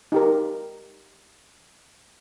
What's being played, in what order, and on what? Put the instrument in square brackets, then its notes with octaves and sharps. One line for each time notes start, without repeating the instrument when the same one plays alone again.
[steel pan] D#4 G4 A#4